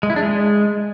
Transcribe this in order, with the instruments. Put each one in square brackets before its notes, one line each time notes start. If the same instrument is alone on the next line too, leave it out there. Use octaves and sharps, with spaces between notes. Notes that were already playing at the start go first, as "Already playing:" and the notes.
[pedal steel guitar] G#3
E4
D4
G#3